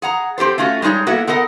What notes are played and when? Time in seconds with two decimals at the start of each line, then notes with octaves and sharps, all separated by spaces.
0.02 G#4 F#5 A#5
0.38 C4 G4 A4 C5
0.58 A3 C#4 F4 F#4
0.82 G3 G#3 D#4 G#4 C#5
1.06 A#3 B3 E4 F#4 A4
1.27 B3 A4 A#4 D#5 F#5